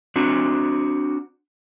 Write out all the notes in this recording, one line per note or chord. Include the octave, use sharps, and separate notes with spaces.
C4 D4 F#4